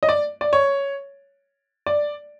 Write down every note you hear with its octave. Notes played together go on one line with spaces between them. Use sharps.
D#5
D5
D5
C#5
D5